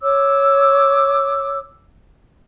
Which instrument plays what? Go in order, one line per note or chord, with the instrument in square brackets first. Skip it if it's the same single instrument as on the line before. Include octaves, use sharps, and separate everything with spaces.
[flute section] C#5 D6 E6